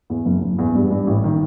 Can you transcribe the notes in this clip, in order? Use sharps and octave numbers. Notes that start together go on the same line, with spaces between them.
E2
F#1
F#1
E2
G2
G2
A1
D#3